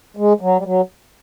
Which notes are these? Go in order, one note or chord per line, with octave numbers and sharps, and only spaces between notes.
G#3
F#3
G3
F#3